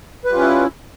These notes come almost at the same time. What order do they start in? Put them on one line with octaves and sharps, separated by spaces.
B4 G3 F4 C#4 E4